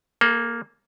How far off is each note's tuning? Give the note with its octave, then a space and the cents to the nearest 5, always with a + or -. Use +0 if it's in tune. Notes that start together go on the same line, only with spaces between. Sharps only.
A#3 +0 A4 -40